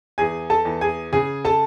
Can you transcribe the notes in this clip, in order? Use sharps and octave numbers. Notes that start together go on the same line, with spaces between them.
E2 G#4 G#5
A4 A5
E2
G#4 G#5
C#3 G#4 G#5
A4 A5